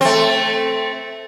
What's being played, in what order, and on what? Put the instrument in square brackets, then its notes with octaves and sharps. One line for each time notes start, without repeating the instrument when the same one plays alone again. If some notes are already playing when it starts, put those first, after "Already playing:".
[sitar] A3 C4